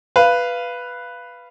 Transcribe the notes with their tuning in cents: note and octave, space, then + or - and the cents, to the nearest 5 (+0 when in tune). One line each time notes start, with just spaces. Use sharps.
B4 +0 F5 -15